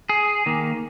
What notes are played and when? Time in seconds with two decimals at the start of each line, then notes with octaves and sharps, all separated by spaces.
0.09 G#4
0.46 D#3 A#3